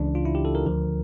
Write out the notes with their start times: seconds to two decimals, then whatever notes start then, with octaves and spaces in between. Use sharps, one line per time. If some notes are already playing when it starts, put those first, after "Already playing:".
Already playing: C#2 C#3 E3 D4
0.15 F4
0.25 E4
0.35 G4
0.45 A4
0.55 A#4
0.66 D2 D3 F3